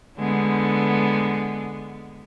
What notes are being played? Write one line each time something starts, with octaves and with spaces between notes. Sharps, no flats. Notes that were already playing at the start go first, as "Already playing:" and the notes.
D3 G#3 B3